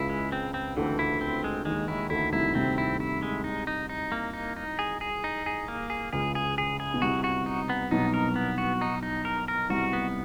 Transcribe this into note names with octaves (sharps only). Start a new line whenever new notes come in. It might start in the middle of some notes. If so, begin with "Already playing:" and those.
Already playing: C#2 C#3 E4
G#3
C4
C4
D2 D3 E3
E4
C4
G#3
D#2 D#3 G#3
D#2 D#3 E4
D2 D3 E4
C2 C3 E4
C2 C3 C4
E4
E4
G#3
D#4
D#4
D#4
A#3
D#4
D#4
G#4
G#4
D#4
G#4
A#3
G#4
C#2 C#3 G#4
G#4
G#4
G#4
B2
C2 C3 F#4
F#4
D#4
B3
B1 B2 D#4
A#4
B3
F#4
D#4
D#4
A#4
A#4
C2 C3 F#4
B3